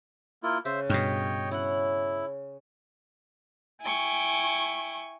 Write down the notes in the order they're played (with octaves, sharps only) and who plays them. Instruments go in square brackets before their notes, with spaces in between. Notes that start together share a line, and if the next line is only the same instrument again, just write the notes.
[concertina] A#3 E4 F4
[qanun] C#3 [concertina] C5 E5
[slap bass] G2 B2 [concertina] C#5 D#5 G5
[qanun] C#4 C#5 F#5 [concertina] E4
[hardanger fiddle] E4 G5 [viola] G#5 C#6